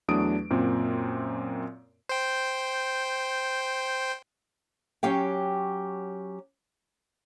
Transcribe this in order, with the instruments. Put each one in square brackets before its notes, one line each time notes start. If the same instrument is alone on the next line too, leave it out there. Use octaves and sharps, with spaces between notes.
[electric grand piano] E2 F#3 A3 D4 D#6 D7
F#2 A#2 C4
[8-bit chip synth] C5 G5
[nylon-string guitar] F#3 C#4 G4 F5 G5